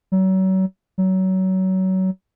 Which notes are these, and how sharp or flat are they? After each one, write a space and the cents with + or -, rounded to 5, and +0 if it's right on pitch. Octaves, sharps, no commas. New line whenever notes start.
F#3 +35
F#3 +25